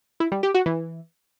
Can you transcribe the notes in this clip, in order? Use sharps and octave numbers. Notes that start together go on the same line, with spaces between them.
E4
G3
G4
F#4
E3